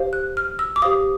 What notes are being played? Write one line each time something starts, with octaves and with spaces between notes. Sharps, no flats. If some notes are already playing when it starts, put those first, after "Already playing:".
Already playing: G4 C5 F5
F#6
F6
E6
D6
G4 C5 F5 D#6